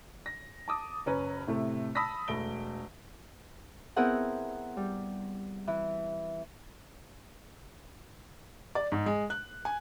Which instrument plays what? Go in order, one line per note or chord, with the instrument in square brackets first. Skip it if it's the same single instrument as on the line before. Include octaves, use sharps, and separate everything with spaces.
[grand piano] A#6
A5 D6 D#6
F#1 C#4 B4 A#5
A2 C3 A3
A5 B5 D#6 E6 A#6 B6
E1 A3 D7 G7
[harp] B3 C4 E4 G#4 A#4 F#5
G3
E3
[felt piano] D5
G#2
G#3
F#6
G#5